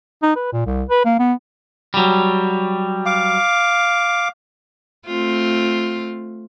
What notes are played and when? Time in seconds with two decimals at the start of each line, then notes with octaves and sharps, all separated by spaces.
0.22 D#4
0.36 B4
0.53 A#2
0.66 C2
0.89 B4
1.05 A#3
1.20 B3
1.94 F#3 G3
3.06 F5 D6
5.07 A3 C4 F4